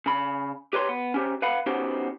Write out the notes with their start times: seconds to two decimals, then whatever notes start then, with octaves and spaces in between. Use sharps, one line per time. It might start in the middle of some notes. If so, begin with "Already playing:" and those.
0.06 C#3 B5
0.73 G4 B4 C#5 C6
0.89 B3
1.14 C#4 G4 C5
1.42 B4 F5 F#5 B5
1.66 B3 C#4 D#4 F#4 G4 C5